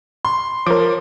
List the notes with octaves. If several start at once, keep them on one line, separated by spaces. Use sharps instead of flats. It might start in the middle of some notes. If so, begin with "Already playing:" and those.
C6
F3 A#4 C#5 D6